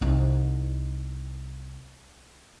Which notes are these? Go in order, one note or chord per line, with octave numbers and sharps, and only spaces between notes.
C2 D#4